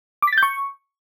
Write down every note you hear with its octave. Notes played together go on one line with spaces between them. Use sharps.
D6
B6
A6
G6
C#6